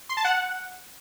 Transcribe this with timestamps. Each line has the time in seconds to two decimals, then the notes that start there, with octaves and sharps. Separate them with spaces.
0.09 C6
0.17 A5
0.25 F#5